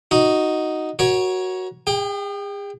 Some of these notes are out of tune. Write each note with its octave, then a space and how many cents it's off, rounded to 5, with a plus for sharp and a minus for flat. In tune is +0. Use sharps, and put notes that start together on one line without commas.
D#4 +0 F#4 +0
F#4 +0 A#4 +30 C#5 +0
G#4 -40 G5 +5